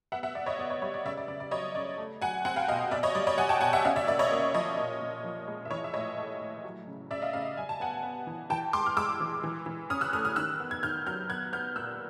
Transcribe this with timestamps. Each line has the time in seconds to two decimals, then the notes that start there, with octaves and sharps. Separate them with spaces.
0.12 B3 E5 F#5
0.23 E5 F#5
0.35 B3 D5 E5
0.46 C#5 D#5
0.59 B3 D5
0.70 C#5
0.82 G3 C#5
0.94 D5
1.05 C#3 D5 E5
1.17 D5
1.28 C#3 D5
1.40 D5
1.51 F#3 C#5 D#5
1.75 C#3 D5
1.98 A3
2.22 F#3 F#5 G#5
2.45 C4 F#5 G#5
2.56 F5 G5
2.68 B2 D#5 F5
2.91 B2 D5 E5
3.03 C#5 D#5
3.15 G3 D5
3.27 C#5 D#5
3.37 G3 F#5 G#5
3.49 G5 A5
3.61 B2 F#5 G#5
3.73 E5 F#5
3.85 C#4 D#5 F5
3.96 D5 E5
4.07 A#3 D5 E5
4.19 C#5 D#5
4.31 A#3 D5
4.54 F3 C#5 D#5
4.78 A#2
5.00 A#2
5.24 F3
5.47 G#3
5.65 E5
5.70 E3 C#5 D#5
5.84 E5
5.94 A2 C#5 D#5
6.17 A3
6.40 A2
6.64 F#3
6.87 C#3
7.10 C#3 D5 E5
7.22 D#5 F5
7.33 C#3 D#5 F5
7.57 G3 G#5
7.69 A5
7.80 B3 F#5 G#5
8.03 B3
8.27 E3
8.50 E3 G5 A5
8.73 G#3 C6 D6
8.86 F6
8.97 G#3 D6 E6
9.20 E3
9.44 E3
9.66 E3
9.90 C#4 D#6 F6
10.01 E6 F#6
10.13 A3 D#6 F6
10.25 D#6 F6
10.36 D#3 E6 F#6
10.60 B3
10.71 G#6
10.83 D#3 F6 G6
11.06 F#3 F6 G6
11.30 B3 F#6 G#6
11.53 B3 F6 G6
11.76 A#2 E6 F#6